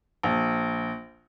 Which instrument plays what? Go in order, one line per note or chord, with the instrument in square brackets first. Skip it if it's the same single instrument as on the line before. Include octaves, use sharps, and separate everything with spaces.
[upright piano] A#1